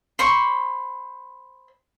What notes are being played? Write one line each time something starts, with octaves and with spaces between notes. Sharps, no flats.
C5 B5 C#6